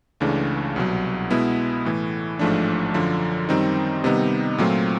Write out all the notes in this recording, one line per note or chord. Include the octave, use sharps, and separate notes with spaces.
C#2 C#3 E3 A3 D4
C2 B2 F#3
B2 G#3 B3 E4
A2 E3 A3
A1 G#2 F3 A3 D4
F#2 D3 F3
F#2 D#3 G3 C4 D#4
C3 D#3 G3 B3 D#4
A#2 F#3 A3 C4 F4